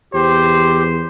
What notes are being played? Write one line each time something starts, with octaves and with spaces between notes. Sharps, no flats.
E2 G4 C5